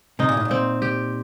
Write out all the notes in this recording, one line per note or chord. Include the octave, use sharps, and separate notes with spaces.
C3 D#4
A#2
A2
A#2
C4
G4